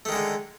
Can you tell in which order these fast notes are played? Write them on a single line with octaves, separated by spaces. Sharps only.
A3 D#3 G#3 D3